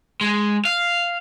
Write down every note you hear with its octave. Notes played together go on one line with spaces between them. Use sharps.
G#3
F5